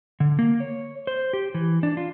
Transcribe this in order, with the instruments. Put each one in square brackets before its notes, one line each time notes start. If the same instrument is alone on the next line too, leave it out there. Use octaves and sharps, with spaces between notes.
[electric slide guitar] D3
A#3
C#5
C5
G4
E3
D4
F4